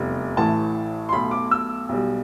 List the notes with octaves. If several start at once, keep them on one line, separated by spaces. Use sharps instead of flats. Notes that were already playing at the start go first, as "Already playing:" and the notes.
Already playing: F1 E2 C3 G3
A1 A2 E3 A3 A5
C6
B1 B2 A3 B5
D6
E6
B1 B2 G3